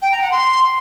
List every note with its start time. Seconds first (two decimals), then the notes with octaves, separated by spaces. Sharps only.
0.01 G5
0.11 A#5
0.21 F#5
0.31 C6